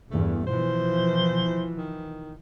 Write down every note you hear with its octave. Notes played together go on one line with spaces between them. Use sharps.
E2 G2 A3
B2 E3 F3 C5
D#3